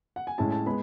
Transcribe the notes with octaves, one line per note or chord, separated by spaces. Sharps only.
F#5
G#5
A2 G#3 C#4 E4 A5
A5
G#3 B3 B5